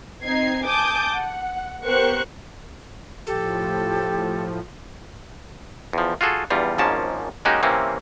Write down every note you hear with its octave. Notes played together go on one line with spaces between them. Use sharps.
C4 D#4 G#6 C7
G#5 A5 D6 D#6 G6
F#5
B3 G4 A#4 C5 C#6 F#6
A2 F3 G4 A4
E2 F3
F4 F#4 G#4 A4
E2 G2 G3 F4
G#1 G#2 F3 A#3 C#4 A5
G#3 A#3 C#4 D#4 F#4 G4
C3 E3 A#3 C4 C#4